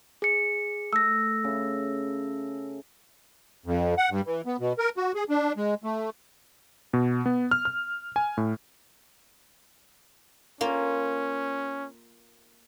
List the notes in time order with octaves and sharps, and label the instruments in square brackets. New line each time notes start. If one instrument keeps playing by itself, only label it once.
[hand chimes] G#4 C#7
[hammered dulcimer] A3 [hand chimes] E6 A#6
[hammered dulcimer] C#3 E5
[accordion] F2
F#5
G2
E3
B3
B2
A#4
F#4
G#4
D4
G#3
A3
[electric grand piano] B2
B3
F6
F6
G#5
A2
[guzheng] A#3 F4 [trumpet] C#4